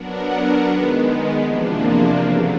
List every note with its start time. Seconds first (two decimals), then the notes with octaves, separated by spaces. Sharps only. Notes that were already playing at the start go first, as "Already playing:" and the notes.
Already playing: F#3 B3 D4 F#4 A#4
0.65 D#3 G#3 B3
1.41 E2 C3 F3 A#3 D4
2.18 E2 C#3 F#3 A3